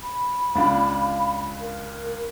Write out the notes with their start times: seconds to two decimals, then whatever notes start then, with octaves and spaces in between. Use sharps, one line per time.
0.03 B5
0.55 C#2 D4 F4
1.61 A#4